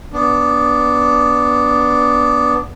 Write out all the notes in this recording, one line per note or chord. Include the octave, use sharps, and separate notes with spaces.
B3 D4